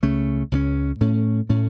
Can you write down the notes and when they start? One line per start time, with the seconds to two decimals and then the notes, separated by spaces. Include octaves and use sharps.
0.03 C#2 C#3 A3 C#4
0.52 C#2 C#3 A3 C#4
1.01 A2 A3 C#4
1.49 A2 A3 C#4